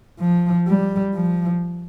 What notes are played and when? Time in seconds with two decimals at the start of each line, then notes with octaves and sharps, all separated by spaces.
0.20 F3
0.68 G3
1.14 F3